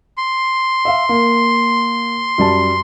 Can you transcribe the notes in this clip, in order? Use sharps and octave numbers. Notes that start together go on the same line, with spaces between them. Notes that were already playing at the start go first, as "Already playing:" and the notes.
C6
E5 F5
A#3
F#2 G3 A5